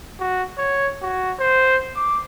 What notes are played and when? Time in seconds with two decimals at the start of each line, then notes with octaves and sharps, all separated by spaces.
0.20 F#4
0.58 C#5
1.02 F#4
1.40 C5
1.96 D6